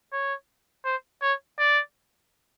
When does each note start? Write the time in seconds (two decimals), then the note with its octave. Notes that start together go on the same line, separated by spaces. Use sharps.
0.12 C#5
0.85 C5
1.22 C#5
1.58 D5